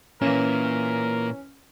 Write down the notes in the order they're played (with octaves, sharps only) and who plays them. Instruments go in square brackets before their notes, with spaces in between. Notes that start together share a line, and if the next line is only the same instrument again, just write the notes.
[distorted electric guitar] A#2 [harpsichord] E3 A#3 E4 [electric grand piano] C#4 [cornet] A#4